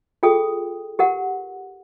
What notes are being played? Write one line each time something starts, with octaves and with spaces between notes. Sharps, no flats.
F4 G#4 A4 G5 D#6
G4 A#4 F#5